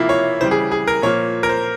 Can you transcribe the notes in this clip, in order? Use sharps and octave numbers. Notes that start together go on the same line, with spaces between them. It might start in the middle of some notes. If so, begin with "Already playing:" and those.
Already playing: C3 F3 A#3 E4 F4
C#5
C#3 E3 G3 C5
G#4
G#4
A#4
A#2 F3 A#3 C#5
A#4
C5